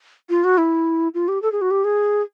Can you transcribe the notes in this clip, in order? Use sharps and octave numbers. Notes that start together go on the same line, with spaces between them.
F4
F#4
E4
F4
G4
A4
G#4
F#4
G4
G#4